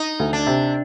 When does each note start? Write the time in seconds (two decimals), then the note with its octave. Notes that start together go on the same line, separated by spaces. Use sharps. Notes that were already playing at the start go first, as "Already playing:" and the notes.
Already playing: D#4
0.20 D2
0.33 D4
0.47 C3